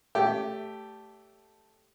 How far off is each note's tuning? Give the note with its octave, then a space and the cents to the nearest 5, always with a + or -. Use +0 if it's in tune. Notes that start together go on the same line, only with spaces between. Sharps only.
A3 +0 G4 -5 C#5 +40